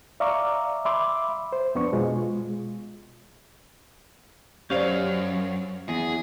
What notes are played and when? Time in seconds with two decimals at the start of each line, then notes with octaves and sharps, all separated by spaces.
0.20 D5 E5 F5 A#5 C#6 D6
0.85 E5 B5 C6 D6
1.52 C5
1.75 F2 B3 D4 C#6
1.92 B2 G#3 F4
4.70 F#2 C#4 G4 C5 D5 F5
5.89 E2 G#4